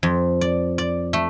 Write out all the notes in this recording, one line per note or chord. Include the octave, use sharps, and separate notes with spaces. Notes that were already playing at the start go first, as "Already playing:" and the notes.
F2
D5
D5
A3